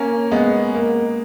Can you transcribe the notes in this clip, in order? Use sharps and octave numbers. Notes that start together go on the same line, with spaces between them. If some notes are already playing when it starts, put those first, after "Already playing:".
Already playing: A#3 C#4
G#3 B3
A#3